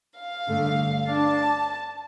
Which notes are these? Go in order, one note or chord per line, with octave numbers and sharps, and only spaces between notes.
F5
G2 D3 A3
D4 A5